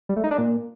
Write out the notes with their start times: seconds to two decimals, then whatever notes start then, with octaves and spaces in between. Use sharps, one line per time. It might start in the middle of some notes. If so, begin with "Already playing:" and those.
0.09 G3
0.16 A3
0.24 D#4
0.31 D4
0.38 A#2